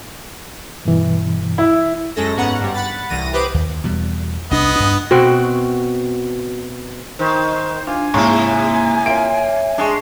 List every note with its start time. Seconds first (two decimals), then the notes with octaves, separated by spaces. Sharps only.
0.85 G2 B2 E3
1.58 E4
2.16 F#2 G#3 C#4 A4 A#6
2.36 G#2 B3 C#4 F#5 A#5
2.60 G2 G3
2.74 F#5 B5 A6
3.10 C2 E3 A#6 D#7
3.33 G4 B4 C5 D6 D#6
3.54 D#2
3.84 E2 B2 G3
4.51 C2 B3 D4 D#5
4.76 G2 D4
5.11 B2 C4 F#4
7.19 D#3 C5
7.87 D4 F4 G#5
8.14 G#2 C3 A#3 E4 A#5 C#6
9.06 A#3 F4 C#5 E5 D7
9.78 G#3 D4 G#4 C#6